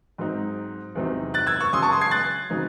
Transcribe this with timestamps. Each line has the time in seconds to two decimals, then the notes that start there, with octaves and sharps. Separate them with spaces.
0.18 G#2 F#3 C4 D#4
0.95 E2 C3 F#3 C4 D#4
1.34 F#6 A6
1.46 E6 G#6
1.60 C#6 E6
1.73 C#3 F#3 C#4 C6 D#6
1.82 A5 C#6
1.92 C6 D#6
2.01 G#6 C7
2.11 F#6 A6
2.50 C#3 F#3 C4 D#4